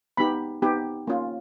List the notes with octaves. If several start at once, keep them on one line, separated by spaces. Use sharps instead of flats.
B3 D#4 G4 B5
B3 D#4 G4
A#3 C#4 F4